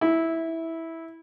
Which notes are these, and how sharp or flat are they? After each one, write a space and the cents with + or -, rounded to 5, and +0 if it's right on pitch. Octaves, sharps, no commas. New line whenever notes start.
E4 -10